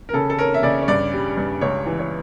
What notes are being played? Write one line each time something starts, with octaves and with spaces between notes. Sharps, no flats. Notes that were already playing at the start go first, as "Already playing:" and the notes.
A#4
C#3 A4
A4
C#4 A#4
E5
C#3 D5
C#5
G2 D5
G3
G2
C#2 C#5
E3
C#5